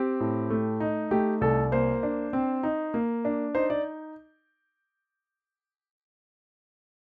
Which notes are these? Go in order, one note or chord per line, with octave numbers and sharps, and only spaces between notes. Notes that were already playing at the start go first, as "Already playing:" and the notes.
Already playing: C4 G4
A2
A3
D#4
A3 G4
C2 A4
A#3 C5
D4
C4
D#4
A#3
D4
D#4 C5
D5